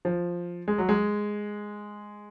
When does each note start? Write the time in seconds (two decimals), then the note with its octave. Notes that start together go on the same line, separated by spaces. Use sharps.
0.05 F3
0.68 G#3
0.78 F#3
0.89 G#3